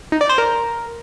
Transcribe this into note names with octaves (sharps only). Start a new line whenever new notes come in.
D#4
D5
C5
A#4